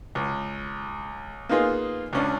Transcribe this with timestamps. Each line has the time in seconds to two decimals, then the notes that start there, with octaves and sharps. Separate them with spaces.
0.15 C#2
1.49 A#3 B3 D#4 F4 G#4
2.13 C#2 C#4 D4